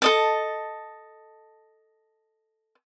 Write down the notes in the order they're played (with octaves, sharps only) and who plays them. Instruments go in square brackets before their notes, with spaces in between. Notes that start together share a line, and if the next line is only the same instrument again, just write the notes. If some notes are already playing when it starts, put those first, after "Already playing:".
[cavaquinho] A4 D#5 A5